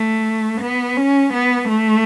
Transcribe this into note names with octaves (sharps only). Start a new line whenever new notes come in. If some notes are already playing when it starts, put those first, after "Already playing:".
Already playing: A3
B3
C#4
B3
A3